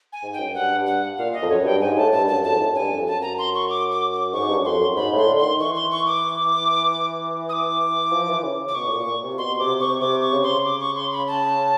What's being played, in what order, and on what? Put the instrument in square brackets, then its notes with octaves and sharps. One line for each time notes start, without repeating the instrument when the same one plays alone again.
[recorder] G#5
[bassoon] G#2
[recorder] G5
[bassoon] F#2
[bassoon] G2 [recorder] F#5
[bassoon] G2
[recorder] F#5
[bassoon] A#2 [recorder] F5
[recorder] D#5
[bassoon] F2
[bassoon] F#2 [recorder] C#5
[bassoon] G2 [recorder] G5
[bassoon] G#2 [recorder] G#5
[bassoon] A2 [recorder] A5
[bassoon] G2 [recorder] A5
[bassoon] F#2 [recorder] A5
[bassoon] F2 [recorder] A5
[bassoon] G#2
A2
F#2
[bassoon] G2 [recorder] G#5
[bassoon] F2
[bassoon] F#2 [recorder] A5
[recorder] A#5
C6
C#6
D6
D6
D6
[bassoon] G#2 [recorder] C#6
[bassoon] G2
F#2
[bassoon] F2 [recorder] C6
[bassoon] F#2
[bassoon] G#2 [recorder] B5
[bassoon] A2 [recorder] C6
[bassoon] D3
[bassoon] D#3 [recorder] C6
[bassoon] E3 [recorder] C#6
[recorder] C6
C#6
D6
D#6
D6
[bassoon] F3
E3
C#3
[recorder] D6
[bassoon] B2 [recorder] C#6
[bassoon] A2
A#2
A#2
C3
[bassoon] B2 [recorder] C6
[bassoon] C3 [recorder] D6
[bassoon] C3 [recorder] C#6
[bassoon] C3 [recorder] D6
[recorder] C#6
[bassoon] C#3
[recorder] C6
D6
C#6
C6
B5
A5